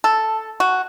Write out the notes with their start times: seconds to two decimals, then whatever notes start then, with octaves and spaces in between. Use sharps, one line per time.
0.04 A4
0.60 F#4